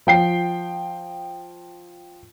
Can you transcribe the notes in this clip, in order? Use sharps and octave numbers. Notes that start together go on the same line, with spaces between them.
F3 G5 C7